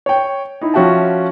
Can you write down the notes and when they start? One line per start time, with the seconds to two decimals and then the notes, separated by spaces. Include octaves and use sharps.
0.06 C#5 G5
0.61 D#4 E4
0.74 F3 C#4 F#4 E5 G5 A5